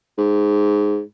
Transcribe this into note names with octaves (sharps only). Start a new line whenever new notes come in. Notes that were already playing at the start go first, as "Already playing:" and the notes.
G#2